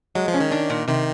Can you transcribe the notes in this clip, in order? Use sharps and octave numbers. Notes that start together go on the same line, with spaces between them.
F#3 G#3
F3
C#4
D#3
D4
A#2
C3 D#3